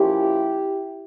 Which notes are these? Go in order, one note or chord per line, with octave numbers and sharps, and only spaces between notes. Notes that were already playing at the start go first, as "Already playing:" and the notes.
Already playing: A#2 F3 C#4 E4 G4